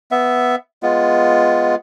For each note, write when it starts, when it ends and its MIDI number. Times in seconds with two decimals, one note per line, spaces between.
0.11 0.56 59
0.11 0.56 76
0.83 1.75 56
0.83 1.75 59
0.83 1.75 65